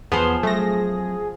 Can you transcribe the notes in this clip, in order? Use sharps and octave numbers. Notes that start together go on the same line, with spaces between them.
E2 F3 B3 G#4 C5
F#3 G3 A3 C4 A#6